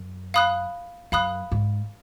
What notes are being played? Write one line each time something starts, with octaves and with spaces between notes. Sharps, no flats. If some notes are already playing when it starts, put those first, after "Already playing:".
Already playing: F#2
F5 B5 D#6 F#6
F#2 F5 B5 D#6 F#6
G#2